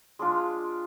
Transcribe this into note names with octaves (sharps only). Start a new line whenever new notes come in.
G#3 D4 F4